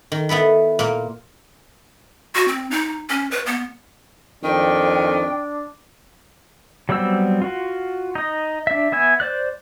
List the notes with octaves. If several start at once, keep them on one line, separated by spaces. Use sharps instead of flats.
D#3
B3 E4 A4 B4
A#2 A#3
F#4
C4
D#4
C#4
B4
B3
F2 D#3 D4 G5
F#3 G3 B3 C4 E6
F4 F#4
D#4 D#5
D4 E5
B3 E5 G#5
C5 D5 F#6